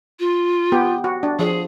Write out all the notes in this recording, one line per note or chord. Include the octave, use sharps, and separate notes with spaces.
F4
B3 G4
F#4
D4
F3 G#4